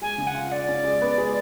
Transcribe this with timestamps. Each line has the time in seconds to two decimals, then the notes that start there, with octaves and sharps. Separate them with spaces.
0.01 G#3 G#5
0.18 C#3
0.27 F#5
0.35 F4
0.51 F4 D5
0.68 C#4
0.84 G#3
1.02 B3
1.18 G#3